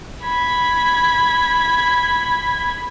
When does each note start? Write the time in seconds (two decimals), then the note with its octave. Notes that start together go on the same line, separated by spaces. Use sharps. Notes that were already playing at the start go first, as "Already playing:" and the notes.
0.24 B5 G#6